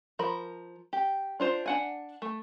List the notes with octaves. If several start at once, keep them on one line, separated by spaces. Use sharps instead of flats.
F3 A#4 B5
G4
D4 F4 C5
D4 F#5 G#5
A3